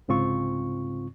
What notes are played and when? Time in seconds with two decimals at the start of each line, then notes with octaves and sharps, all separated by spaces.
0.08 C2 G#2 C#3 C4 F4 C#6